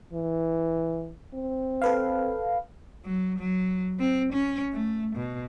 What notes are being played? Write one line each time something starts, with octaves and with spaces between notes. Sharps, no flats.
E3
C4
A4 B4 F5
F#3
F#3
C4
C#4
A3
B2